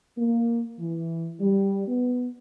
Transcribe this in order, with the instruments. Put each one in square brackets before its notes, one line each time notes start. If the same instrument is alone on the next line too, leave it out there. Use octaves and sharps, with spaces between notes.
[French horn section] A#3
E3
G3
B3